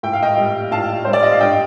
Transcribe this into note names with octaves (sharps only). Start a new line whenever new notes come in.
A2 G5
F5
D#5 G5
G3
A2 F5 A5
G3 C5
D5
D#5
F5
G2 D#5 G5